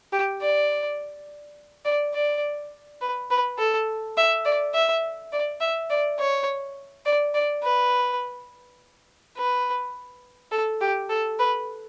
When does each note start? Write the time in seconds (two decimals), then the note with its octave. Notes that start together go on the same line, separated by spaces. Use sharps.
0.12 G4
0.41 D5
1.85 D5
2.14 D5
3.01 B4
3.30 B4
3.58 A4
4.17 E5
4.45 D5
4.74 E5
5.32 D5
5.60 E5
5.90 D5
6.19 C#5
7.05 D5
7.34 D5
7.63 B4
9.37 B4
10.52 A4
10.81 G4
11.09 A4
11.39 B4